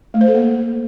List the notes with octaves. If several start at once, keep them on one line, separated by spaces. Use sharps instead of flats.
A3
C5
A4
A#3